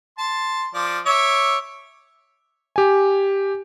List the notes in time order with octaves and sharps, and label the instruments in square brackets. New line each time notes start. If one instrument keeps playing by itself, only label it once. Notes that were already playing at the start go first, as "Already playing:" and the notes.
[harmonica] A5 C6
F3 D5
C#5 E5 D6
[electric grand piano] G4 G#5